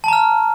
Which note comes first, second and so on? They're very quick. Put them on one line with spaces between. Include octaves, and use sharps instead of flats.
A5 A#5 F6